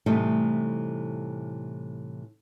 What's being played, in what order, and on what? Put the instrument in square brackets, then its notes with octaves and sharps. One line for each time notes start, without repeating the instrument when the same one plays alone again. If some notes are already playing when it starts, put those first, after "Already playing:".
[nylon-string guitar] A2 C3 E3 G3 A3 D#4